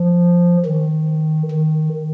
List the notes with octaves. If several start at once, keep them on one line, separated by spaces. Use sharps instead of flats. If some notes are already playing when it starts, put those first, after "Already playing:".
Already playing: F3
D#3
D#3